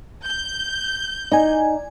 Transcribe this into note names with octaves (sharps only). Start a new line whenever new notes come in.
G6
D#4 D5 G#5